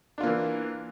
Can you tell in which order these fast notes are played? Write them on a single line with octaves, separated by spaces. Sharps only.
D4 F4 A#3 E3